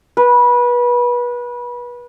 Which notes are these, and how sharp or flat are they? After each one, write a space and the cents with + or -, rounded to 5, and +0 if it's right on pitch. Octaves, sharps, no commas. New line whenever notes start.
B4 -25